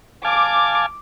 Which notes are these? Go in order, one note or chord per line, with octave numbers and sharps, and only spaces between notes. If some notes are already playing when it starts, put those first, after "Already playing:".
F5 G#5 A5 D6